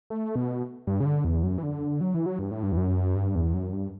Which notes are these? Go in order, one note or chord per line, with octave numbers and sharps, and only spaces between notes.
A3
B2
G2
C#3
D3
E2
F#2
E3
D3
F#3
E3
F#3
G2
A2
G2
E2
F#2
G2
E2
F#2
G2